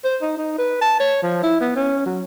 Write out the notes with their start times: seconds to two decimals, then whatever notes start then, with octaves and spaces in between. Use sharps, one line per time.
0.05 C5
0.22 D#4
0.37 D#4
0.59 B4
0.82 A5
1.00 C#5
1.23 F3
1.43 E4
1.61 B3
1.76 C#4
2.06 F#3